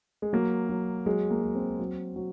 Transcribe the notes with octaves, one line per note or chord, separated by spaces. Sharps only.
G#3
F#3 A#3
F#3
F#3 G#3
A#3
F#3
C4
F#3
F#3